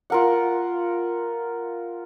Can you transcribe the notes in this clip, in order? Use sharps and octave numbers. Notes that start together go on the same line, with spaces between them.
F4 A#4 F#5